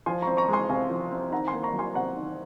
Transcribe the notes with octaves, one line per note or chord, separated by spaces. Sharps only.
F3 G#5 C6
C4 A#5 C#6
A#5 C#6
G#3 G#5 C6
C3 F5 G#5
F3
C4
D#3 F#5 A#5
G#5 C6
A#3
A#5 C#6
F#3
G#5 C6
C3 F#5 A#5
D#3